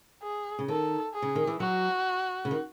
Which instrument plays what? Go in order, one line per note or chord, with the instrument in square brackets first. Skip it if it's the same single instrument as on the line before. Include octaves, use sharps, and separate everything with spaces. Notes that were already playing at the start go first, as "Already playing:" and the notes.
[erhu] G#4
[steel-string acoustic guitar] C#3
[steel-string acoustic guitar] D#3 [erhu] A4
[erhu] G#4
[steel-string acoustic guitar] C#3
D#3
E3
[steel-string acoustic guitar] F#3 [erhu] F#4
[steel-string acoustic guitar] C#3
D#3